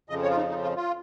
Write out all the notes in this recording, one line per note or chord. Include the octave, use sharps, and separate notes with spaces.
F2 C#3 F3 D#5
C#5
F4
D#4
D#4
F4
F4